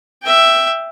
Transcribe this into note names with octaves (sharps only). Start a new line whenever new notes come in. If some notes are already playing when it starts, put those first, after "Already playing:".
E5 G5